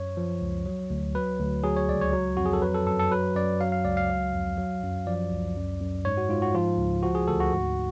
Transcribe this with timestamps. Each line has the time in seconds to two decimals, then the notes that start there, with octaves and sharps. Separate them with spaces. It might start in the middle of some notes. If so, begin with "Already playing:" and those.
Already playing: F#2 C#5
0.17 F3
0.42 C#2
0.66 F#3
0.90 D2
1.15 F#3 B4
1.39 D2
1.64 F#3 G#4
1.76 C#5
1.88 C#2 D5
2.01 C#5
2.13 F#3
2.37 F2 F#4
2.46 G#4
2.53 A4
2.62 F#3 B4
2.75 A4
2.87 F#2 A4
2.99 A4
3.11 F#3 B4
3.36 F#2 D5
3.60 F#3 F5
3.72 F5
3.85 C#2 D5
3.97 F5
4.10 F#3
4.34 F2
4.58 F#3
4.83 F#2
5.07 F3 D5
5.31 C#2
5.57 F#2
5.81 F#2
6.05 G#2 C#5
6.17 F#4
6.29 G#2 F4
6.42 F#4
6.55 F3 F4
6.78 C#2
7.03 F3 F#4
7.15 G#4
7.28 D2 A4
7.40 F#4
7.52 G#2